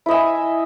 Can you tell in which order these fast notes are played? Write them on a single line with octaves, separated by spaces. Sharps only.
E4 D#5 E5 G#5